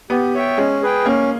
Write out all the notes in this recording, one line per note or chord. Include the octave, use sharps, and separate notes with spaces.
B3 G4
C#5 E5 G5
G#3 C#4
G#4 B4 G5
A#3 C#4